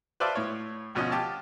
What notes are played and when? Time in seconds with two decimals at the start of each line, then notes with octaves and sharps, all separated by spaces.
0.20 B4 C5 D5 E5 F5 A5
0.35 A2 C#5
0.95 D2 B2 F3 C#4 D#5
1.11 F4 G4 A5